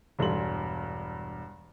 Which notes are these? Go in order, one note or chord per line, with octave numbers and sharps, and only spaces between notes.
E1 G2 A4 C6 F#7